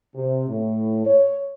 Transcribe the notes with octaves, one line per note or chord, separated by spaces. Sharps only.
C3
A2
C#5